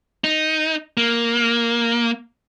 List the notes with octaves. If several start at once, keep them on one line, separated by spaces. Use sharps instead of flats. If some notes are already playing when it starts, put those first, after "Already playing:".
D#4
A#3